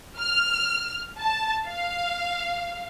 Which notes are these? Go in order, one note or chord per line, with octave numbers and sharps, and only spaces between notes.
F6
A5
F5